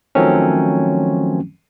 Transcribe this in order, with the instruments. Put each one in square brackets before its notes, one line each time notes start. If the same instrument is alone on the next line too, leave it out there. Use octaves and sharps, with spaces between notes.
[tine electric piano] D#3 F3 F#3 A3 C4 C#4